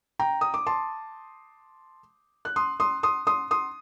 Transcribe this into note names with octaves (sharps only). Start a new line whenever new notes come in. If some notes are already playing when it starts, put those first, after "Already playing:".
G5 A#5
D#6
D6
A5 C6
F#6
C6 D#6
C6 D#6
C6 D#6
C6 D#6
C6 D#6